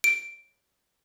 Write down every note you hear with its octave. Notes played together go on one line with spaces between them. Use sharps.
D7